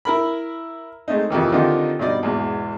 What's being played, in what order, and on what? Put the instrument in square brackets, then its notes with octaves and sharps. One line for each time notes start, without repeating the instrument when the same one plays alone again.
[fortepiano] E4 A#4 B5
G#3 A3 C4 D#4
F2 C3 D#3 E3
D3 D#3 C4 D#4 F4 G4
G2 B2 D#4 D5
E2 G#2 B2